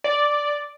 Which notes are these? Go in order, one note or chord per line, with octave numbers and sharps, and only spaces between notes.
D5